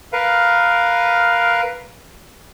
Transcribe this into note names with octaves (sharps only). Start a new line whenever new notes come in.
A#4 B4 F5